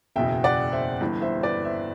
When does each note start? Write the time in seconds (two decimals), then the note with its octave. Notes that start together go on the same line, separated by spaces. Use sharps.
0.16 F#1 E2 B2 E5 G5
0.44 D5 F#5
0.73 C5 E5
1.00 G1 G2 E3
1.22 C5 E5
1.43 B4 D5
1.65 C5 E5